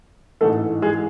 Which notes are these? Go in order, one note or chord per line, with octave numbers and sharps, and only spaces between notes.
A1 G#2 E3 A3 A4
G#3 G#4